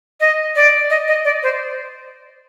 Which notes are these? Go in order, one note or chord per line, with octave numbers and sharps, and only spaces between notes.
D#5
D5
D#5
D#5
D5
C5